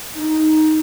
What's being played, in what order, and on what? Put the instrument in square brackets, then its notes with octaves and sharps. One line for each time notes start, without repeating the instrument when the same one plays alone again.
[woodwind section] D#4